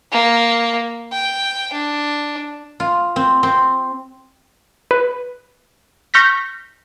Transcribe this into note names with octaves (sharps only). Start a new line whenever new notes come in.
A#3
G5
D4
F4
C4
C4
B4
C#6 F6 G6 A#6 B6